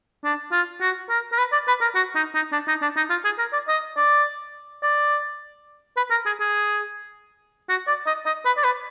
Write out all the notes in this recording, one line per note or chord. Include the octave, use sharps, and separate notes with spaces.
D4
F4
F#4
A#4
A#4
B4
D5
B4
A#4
F#4
D#4
D#4
D4
D#4
D4
D#4
F4
G#4
A#4
D5
D#5
D5
D5
B4
A#4
G#4
G#4
F#4
D5
D#5
D#5
B4
D5
B4